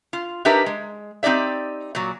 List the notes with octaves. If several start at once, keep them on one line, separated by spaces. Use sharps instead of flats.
F4
D4 D#4 G4 A#4 B4 E5
G#3
C4 D#4 G4 D5 E5
A#2 F#3